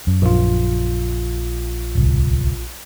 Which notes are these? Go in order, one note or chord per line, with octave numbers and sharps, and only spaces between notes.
F#2
A#1 F4
D1 C2